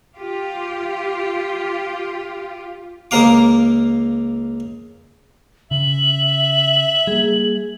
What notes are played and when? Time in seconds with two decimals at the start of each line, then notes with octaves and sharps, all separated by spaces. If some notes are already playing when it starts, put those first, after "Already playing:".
0.16 F4 G4
3.11 C#2 A#3 A#4 F5 D6
5.71 C#3 E5 F#7
7.07 G3 A#3 G#4